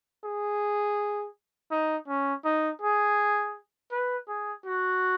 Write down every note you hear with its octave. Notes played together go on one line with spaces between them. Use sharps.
G#4
D#4
C#4
D#4
G#4
B4
G#4
F#4